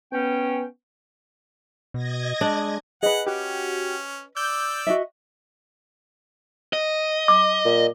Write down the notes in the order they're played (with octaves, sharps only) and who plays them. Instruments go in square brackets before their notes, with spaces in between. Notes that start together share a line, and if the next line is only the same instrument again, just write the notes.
[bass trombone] B3 [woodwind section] C#4 G5
[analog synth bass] B2 [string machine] D#5 G#6 A#6
[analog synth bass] G#3 [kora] D4
[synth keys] G#4 [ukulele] B4 D#5 [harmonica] F#5
[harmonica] C#4 [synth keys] F#4 G4
[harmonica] D5 E6 [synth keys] G6
[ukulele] F#4 D#5 E5
[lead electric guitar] D#5
[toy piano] D6
[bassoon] A#2